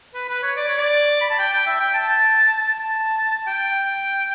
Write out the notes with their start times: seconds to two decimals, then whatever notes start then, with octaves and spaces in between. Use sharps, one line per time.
0.15 B4
0.29 B4
0.43 C#5
0.57 D5
0.68 C#5
0.78 D5
1.21 B5
1.30 A5
1.39 G5
1.54 G5
1.67 E5
1.80 G5
1.94 A5
2.09 A5
2.63 A5
3.47 G5